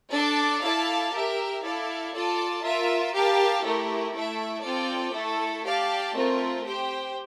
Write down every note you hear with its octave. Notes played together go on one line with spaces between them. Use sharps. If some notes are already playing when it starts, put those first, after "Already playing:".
D4 A4 D5 A5
E4 A4 D5 F5 A5
G4 A#4 E5
E4 A4 D5 F5
F4 A4 D5 A5
F4 A#4 E5
G4 A#4 F5 A5
A3 E4 G4 A#4
A3 E4 A4 E5
C4 F4 A4 D5 G5
A3 E4 A4
G4 D5 F5 A5
A3 C4 F4 A#4
G4 C5 G5